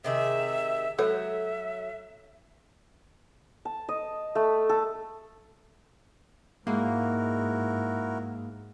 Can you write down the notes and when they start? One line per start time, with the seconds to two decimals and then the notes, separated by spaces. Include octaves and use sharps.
0.04 C3 D#3 G#4 E5
0.99 F#3 A4 C#5 E5 E6
3.65 A5
3.89 D#5
4.35 A3
4.69 A4
6.67 G#2 G#3 A#3 E4 F#4 A#4